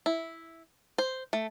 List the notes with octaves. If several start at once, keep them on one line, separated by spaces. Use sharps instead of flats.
E4
C5
A3